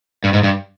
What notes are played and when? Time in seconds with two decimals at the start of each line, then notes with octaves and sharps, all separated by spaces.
0.24 G2
0.33 G#2
0.43 G2